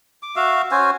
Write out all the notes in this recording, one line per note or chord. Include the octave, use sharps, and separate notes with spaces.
D6
F#4 E5 F5
C#4 F#4 C5 G#5